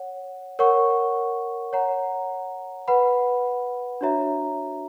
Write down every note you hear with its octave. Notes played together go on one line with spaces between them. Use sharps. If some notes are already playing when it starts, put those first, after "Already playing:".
Already playing: C#5 F#5
A#4 C#5 F#5 C#6
C#5 F#5 A#5
B4 F#5 B5
D4 F#4 C#5 E5 A#5